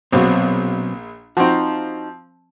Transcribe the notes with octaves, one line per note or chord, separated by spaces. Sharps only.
A#1 B2 F#3 C4
F3 C4 D#4 F#4